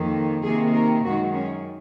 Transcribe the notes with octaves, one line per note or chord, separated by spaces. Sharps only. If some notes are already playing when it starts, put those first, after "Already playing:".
Already playing: F2 D#3 A#3
C3 D#3 A#3 G#4
A#4
F#2 D#3 G#3 F#4
C#4